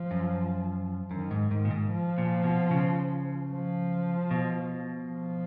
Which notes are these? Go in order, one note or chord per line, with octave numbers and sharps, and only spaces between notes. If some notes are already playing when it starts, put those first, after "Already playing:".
Already playing: F3
F#2
F#2 D#3
G#2
G#2 D#3
A#2
G#2
F3
A#2
B2
C#3
F3
B2
F3